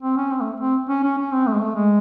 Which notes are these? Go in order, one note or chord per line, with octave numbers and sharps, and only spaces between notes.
C4
C#4
C4
A3
C4
C#4
C#4
C#4
C4
A3
G#3
A3
G#3